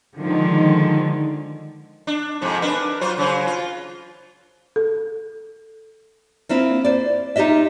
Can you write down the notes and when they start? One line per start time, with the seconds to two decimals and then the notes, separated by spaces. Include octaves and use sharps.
0.18 D3 D#3 F3 G#3
2.07 D4
2.41 F2 G#2 C3
2.62 D4 A#4 B4
3.01 F#3 F4 C5
3.17 C#3 F#3 C5
3.47 F4
4.76 A4
6.49 A#3 C4 E4 F4
6.85 C5 D5
7.36 D#4 F4 G4 D#5 E5